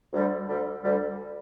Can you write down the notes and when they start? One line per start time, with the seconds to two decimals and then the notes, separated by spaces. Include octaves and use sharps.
0.13 D2 D3 G3
0.47 D2 D3 G3
0.82 D2 D3 G3